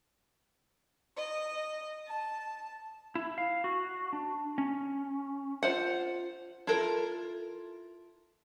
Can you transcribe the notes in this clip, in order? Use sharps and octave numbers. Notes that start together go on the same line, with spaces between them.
D#5
A5
E4
F5
F#4
D4
C#4
F4 C5 F#5
E4 F4 A4 A#4